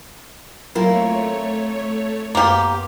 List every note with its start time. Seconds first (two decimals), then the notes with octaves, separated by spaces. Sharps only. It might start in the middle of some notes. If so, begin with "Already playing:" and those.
0.75 F#3 A3 A#3 C4 E4 F4 A#4 C#5
2.35 F#2 A#3 B3 F4 G4